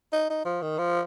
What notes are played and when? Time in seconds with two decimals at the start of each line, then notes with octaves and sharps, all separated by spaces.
0.13 D#4
0.30 D#4
0.45 F3
0.62 D#3
0.78 F3